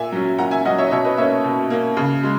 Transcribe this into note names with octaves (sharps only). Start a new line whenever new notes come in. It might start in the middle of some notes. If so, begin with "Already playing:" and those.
Already playing: A#2 E5 G#5
F#3 C#4
A#2 F#5 A#5
E5 G#5
F#3 C#4 D#5 F#5
C#5 E5
D#5
B2 C#5 E5
B4 D#5
A#3 C#4 C#5 E5
B2
A#3 C#4
C#3
G#3